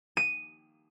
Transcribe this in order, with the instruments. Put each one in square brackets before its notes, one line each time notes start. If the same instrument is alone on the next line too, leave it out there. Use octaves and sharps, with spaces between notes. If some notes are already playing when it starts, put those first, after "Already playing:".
[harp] D#7